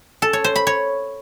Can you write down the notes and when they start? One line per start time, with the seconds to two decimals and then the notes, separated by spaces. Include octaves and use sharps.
0.22 A4
0.33 C#5
0.44 C5
0.56 B5
0.67 C#5